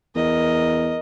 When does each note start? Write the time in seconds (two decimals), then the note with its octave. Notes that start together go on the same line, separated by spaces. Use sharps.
0.15 E2 A#4 D#5